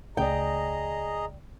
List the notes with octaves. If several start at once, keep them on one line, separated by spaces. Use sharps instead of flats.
C#2 C#3 A3 G#4 D5 D#5 G5 A#5